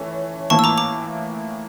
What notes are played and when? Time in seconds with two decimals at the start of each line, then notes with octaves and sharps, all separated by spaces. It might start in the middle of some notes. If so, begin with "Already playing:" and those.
Already playing: E3 A3 C#4
0.50 A2 E3 A#3 A5 C#6
0.59 E6
0.64 A#5 D6
0.78 A#5 D6